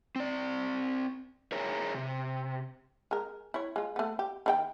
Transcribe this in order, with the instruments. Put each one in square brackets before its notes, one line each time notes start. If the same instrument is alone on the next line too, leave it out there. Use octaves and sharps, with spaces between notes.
[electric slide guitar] C4 D5
G#4 A#4 C#5 E5 A#5
C3
[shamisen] G#3 A#4
E4 C#5
G#3 F4
A3 B3
G4
D#3 D#4 G5